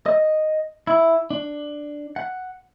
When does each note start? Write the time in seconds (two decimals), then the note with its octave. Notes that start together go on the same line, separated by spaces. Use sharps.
0.06 D#5
0.87 E4
1.30 D4
2.16 F#5